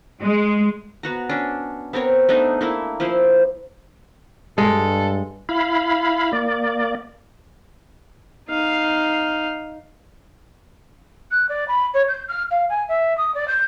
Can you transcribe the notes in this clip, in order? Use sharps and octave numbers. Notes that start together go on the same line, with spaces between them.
G#3
B3 F#4 A#5
C#4 D4
B3 C4 A#4 C#5
A3 B3 D4 D#4
A3 A#3 E4
F3 A#3 E4 C5
G2 G#3 A4
E4 F5 B5
A#3 D5
D#4 F5
F#6
D5
B5
C#5
G6
F6
F5
G#5
E5
D#6
D5
G6